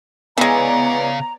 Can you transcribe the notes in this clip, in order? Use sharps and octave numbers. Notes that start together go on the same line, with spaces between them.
C#3 E3 G#3 B3 C#5 D5 F5 A#5